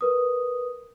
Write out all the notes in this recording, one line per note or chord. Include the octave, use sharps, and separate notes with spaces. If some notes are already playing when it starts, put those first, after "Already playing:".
A#4 B4 D#6